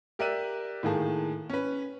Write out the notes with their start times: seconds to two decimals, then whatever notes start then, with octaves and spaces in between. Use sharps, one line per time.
0.19 G4 A#4 D5 E5 F#6 D#7
0.83 A2 D#3 A#3 G#4 A5
1.49 C#4 B4